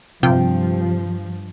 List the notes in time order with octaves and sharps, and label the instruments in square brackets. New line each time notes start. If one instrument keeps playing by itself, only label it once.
[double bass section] G2 F3 [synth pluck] C3 F4 G5